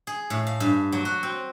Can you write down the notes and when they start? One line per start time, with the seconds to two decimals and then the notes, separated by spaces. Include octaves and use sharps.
0.07 G#4
0.30 A2
0.47 F5
0.60 G2
0.92 F#3
1.05 F#4
1.23 C4